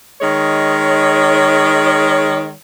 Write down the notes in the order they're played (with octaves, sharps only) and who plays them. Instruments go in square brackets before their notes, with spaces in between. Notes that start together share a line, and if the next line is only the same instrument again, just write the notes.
[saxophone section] D#3 G#3 C#5